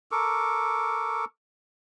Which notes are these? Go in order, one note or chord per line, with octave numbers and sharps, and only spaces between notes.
A4 A#4 C#6 D6